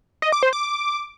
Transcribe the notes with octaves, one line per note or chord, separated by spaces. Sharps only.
D#5
D6
C5
D6